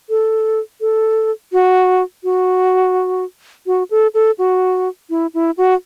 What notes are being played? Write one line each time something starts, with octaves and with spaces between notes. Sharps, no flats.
A4
A4
F#4
F#4
F#4
A4
A4
F#4
E4
E4
F#4